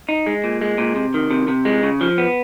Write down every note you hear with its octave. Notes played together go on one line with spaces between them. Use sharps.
D#4
G#3
A#2
G#3
A#2
C3
D#3
C3
C3
G#3
C#3
F3
B3